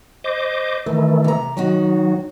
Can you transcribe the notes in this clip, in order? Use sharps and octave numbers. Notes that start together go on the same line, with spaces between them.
C5 D#5 D6
A2 D#3 E3 A3
C3 A#5
D#3 F#3 D#4 F#4